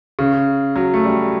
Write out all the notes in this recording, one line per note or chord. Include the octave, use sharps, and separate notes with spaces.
C#3
F#3
A3
G3